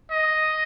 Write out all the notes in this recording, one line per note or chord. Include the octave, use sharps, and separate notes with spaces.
D#5